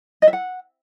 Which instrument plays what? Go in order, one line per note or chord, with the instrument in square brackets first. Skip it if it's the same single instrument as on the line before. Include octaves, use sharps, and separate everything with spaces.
[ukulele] D#5
E5
F#5